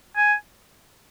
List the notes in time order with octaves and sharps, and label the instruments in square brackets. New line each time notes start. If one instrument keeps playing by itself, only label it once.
[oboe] G#5